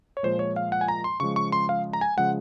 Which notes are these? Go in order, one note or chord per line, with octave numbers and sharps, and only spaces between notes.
C#5
A#2 F3 G#3 C5
C#5
F5
F#5
G#5
A#5
C6
C#3 F3 G#3 C#6
C#6
C6
F5
A#5
G#5
C#3 F3 G#3 F#5